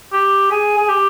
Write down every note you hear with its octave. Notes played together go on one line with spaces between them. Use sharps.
G4
G#4
G#4
G4